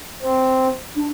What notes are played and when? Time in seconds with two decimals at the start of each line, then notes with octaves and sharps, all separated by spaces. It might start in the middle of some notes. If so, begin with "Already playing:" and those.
0.22 C4
0.96 D4